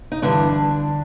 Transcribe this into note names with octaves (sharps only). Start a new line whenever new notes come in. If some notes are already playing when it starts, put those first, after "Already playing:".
D#4
G2 D3 E3 G3 D4